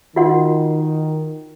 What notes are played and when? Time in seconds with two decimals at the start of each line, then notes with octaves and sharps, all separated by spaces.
0.16 D#3 F4 F#4 F#5